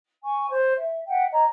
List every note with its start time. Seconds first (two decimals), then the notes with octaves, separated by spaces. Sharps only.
0.23 G#5 C#6
0.49 C5 C#5
0.77 E5
1.08 E5 F#5 G5
1.31 C#5 D#5 A#5